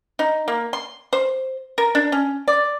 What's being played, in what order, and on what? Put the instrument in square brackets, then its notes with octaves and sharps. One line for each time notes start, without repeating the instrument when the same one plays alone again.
[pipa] D#4
A#3
C6
C5
A#4
D4
C#4
D5